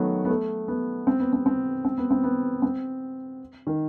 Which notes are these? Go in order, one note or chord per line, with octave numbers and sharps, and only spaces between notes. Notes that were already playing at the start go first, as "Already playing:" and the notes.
Already playing: D#3 F#3 A3 B3
B3
A3
B3
C4
B3
C4
C4
C4
B3
C4
B3
C4
D#3